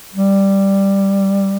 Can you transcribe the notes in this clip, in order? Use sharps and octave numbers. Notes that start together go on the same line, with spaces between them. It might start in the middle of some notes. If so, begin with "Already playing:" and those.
G3